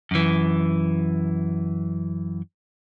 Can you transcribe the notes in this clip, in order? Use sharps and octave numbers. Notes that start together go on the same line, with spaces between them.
F#2 E3